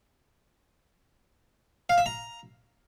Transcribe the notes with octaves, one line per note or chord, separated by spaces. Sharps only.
F5
E5
A#5